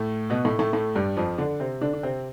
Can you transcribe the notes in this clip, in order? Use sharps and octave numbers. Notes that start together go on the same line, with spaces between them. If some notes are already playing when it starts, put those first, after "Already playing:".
Already playing: A2 A3
B2 B3
A2 A3
A2 A3
A2 A3
G2 G3
F2 F3
D3 D4
C3 C4
D3 D4
D4
C3 C4